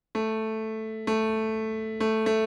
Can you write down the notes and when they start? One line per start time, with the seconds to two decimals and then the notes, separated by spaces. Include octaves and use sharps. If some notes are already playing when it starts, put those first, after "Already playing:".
0.15 A3
1.07 A3
2.00 A3
2.26 A3